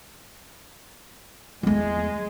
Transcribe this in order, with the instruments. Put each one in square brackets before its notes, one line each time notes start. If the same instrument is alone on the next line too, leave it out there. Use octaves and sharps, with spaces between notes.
[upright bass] E2 A3 [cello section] G#3